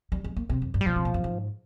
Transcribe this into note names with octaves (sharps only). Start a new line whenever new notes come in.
G3
G#3
A#3
C3
F2
G2
G3
A#2 F3
C3
A#2
G2
G#2